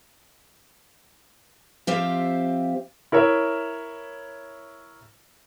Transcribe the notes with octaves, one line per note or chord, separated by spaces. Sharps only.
F3 C4 G4 C5 E5 F5
E4 A#4 C#5 E5